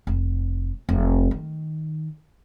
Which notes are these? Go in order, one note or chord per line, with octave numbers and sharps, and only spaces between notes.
F1
F1
D#3